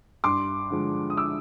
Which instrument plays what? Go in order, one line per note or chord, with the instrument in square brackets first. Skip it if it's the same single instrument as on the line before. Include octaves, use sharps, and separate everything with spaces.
[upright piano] G2 C6 D6
D3 F3 G#3
D#6
D6 E6